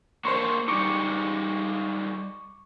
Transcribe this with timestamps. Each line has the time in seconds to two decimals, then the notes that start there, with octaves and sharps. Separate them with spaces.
0.25 A#3 D4 C5 C#5 C6 C#6
0.68 G3 G#3 D#4 C#6 D6